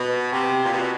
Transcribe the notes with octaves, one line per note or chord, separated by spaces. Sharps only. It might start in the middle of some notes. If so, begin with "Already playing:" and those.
Already playing: B2
C3
A#2
B2